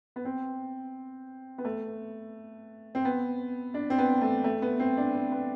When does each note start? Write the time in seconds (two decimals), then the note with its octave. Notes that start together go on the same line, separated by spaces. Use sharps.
0.16 B3
0.25 C4
1.58 B3
1.65 A3
2.95 C4
3.05 B3
3.74 D4
3.90 C4
3.98 B3
4.21 A3
4.44 A3
4.62 B3
4.80 C4
4.97 D4
5.15 C4
5.32 B3